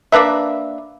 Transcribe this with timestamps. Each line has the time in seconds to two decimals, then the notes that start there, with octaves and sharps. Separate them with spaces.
0.12 A#3 D4 B4 E5